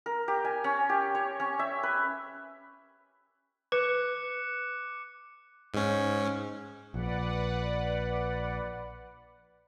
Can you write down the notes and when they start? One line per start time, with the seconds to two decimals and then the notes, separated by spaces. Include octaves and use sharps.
0.06 A#4
0.28 G4
0.45 G#5
0.64 C#4
0.89 G4
1.15 C#5
1.40 C#4
1.59 E5
1.83 B4
3.72 B4 D6 F#6 C#7
5.74 G#2 C#4
6.94 A#1 B4 D5 F#5